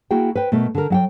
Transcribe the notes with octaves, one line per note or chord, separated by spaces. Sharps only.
A#3 E4 F#4 G#4 G5
B4 C5 G5
B2 A3 A#4
D3 A#4
F#3 F#5 G5